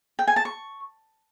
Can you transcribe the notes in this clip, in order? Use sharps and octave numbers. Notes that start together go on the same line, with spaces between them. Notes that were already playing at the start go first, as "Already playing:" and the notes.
G5
G#5
A5
C#6